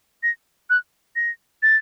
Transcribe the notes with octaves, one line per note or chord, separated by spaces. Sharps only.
A#6
F#6
A#6
A6